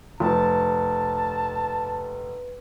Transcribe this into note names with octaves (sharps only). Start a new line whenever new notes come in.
F1 B4 G5 A5 C6